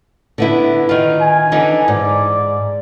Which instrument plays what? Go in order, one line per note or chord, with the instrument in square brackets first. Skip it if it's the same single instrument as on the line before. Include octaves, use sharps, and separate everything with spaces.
[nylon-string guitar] D3 B3 E4
D#3 F4
[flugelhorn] G#5
[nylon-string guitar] D3 E3 D#4
[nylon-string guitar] G#2 [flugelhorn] D5